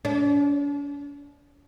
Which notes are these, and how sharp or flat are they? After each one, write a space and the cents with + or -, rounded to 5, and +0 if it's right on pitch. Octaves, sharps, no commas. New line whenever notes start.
D4 -45